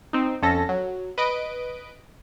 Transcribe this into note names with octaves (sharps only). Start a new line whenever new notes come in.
C4 D#4
F2 C#4 A4 A#6
F#3
B4 D#5 D7